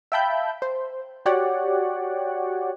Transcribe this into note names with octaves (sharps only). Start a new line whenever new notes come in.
E5 F5 G5 A5 B5 G6
C5
F#4 G4 C#5 D5 F#5